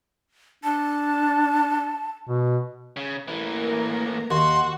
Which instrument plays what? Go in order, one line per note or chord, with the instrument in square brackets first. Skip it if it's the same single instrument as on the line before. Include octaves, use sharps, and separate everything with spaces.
[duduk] D4 [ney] A5
[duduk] B2
[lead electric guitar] C#3
[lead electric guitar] A2 E3 [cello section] A#3 A#4
[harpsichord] D#2 [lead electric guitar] F#4 [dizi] C6